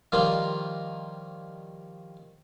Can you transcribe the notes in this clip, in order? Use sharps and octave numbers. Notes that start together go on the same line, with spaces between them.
D#3 F3 G3 A#3 D#4 F4